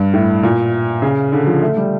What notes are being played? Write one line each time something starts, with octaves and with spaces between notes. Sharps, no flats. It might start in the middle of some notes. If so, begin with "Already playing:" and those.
Already playing: G2
A2
A#2
C#3
D3
F3
A3
G3